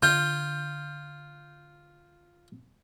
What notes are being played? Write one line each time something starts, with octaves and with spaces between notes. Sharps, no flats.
D3 F4 G6